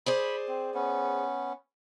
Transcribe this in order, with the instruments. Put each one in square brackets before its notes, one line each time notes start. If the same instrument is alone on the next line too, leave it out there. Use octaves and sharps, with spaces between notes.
[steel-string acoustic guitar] G#4 C5 D5 [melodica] B5
[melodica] C4
B3 C#4